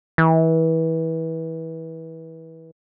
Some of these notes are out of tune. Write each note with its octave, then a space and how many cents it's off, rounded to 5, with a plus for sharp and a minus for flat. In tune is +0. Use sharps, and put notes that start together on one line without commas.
E3 -25